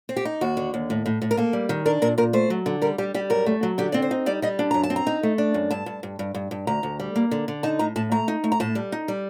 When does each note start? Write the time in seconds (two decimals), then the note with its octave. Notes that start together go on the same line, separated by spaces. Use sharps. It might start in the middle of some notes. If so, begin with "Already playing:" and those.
0.09 C4
0.17 G4
0.25 D#4
0.41 D#2 F#4
0.57 D3
0.74 D#2
0.90 A2
1.06 A2
1.22 A2
1.31 A#4
1.37 A#3 A4
1.53 G3
1.69 D#3
1.86 D4 A#4
2.02 A#2 A#4
2.18 A#2 A#4
2.33 A3 C5
2.50 F#3
2.66 D3
2.82 G3 A#4
2.98 G3 G4
3.14 G3 G4
3.30 F#2 A#4
3.46 A3
3.63 F#3
3.78 D3 G4
3.92 C4 D5
4.02 C5
4.11 D#4
4.26 G3 D5
4.42 G3 D#5
4.59 D4
4.71 F#2 A#5
4.83 A5
4.90 C4
4.96 A#5
5.07 D#4
5.23 A3
5.38 D4
5.54 F#2
5.71 G2 A5
5.86 G2
6.03 G2
6.19 G2
6.35 G2
6.51 G2
6.67 D2 A#5
6.83 D2
7.00 G3
7.16 A#3
7.31 D3
7.48 D3
7.63 D#4 A5
7.79 A2 A#5
7.96 A2 A5
8.12 A3 A#5
8.28 D#4
8.44 A3
8.52 A#5
8.60 A2 A5
8.75 G3
8.92 D#4
9.08 G3